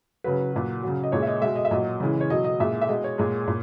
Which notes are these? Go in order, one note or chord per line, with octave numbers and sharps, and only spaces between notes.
C#3 F#3 B4
A#2 F#3
C#3 F#3
D#5
A#2 G#3 C#5
E5
D#5
B2 G#3 E5
D#5
E5
A#2 F#3 D#5
C#3 E3 G#3
C#5
B2 F#3 D#5
D#5
A#2 G#3 E5
E5
B2 G#3 D#5
C#5
A#2 G#3
A#2